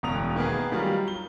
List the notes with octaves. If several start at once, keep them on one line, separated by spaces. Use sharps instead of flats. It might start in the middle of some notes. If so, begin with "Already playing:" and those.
E1 F#2 B2 D#6 F7
D#3 A#3 B3 G#4
D#3 F#3 G3 F4
G7